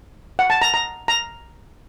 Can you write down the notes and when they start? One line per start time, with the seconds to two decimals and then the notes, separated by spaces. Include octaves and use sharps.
0.39 F#5
0.50 A5
0.62 A#5
0.74 A#5
1.08 A#5